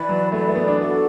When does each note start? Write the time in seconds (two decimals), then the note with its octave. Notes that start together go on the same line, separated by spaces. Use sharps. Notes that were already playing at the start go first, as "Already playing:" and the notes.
Already playing: E3 B4 D5 B5
0.09 F#3
0.32 A3 B4 D5 B5
0.48 A3
0.55 B3
0.68 D4
0.79 F#4 A4 D5